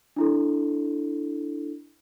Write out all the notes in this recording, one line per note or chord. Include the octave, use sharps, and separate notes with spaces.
D4 E4 A4